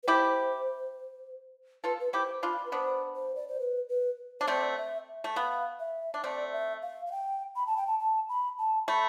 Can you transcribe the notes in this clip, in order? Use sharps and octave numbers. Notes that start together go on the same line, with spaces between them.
B4
E4 G4 C5
F4 A4 B4
B4
E4 G4 C5
D4 F4 B5
B4
B3 D4 C5
C5
D5
C5
B4
B4
D4 C5
A3 C4 D5
E5
A3
B3 F5
E5
D4
A3 C4 D5
E5
F5
F5
G5
B5
A5
G5
A5
A5
B5
A5
A3 B5